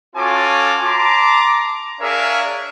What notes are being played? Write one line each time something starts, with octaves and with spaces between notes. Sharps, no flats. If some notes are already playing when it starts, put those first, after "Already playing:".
C#4 F4 F#4 A4 G#5 D6
A5 A#5 C6 D6
D4 G#4 A#4 C#5 E5 F5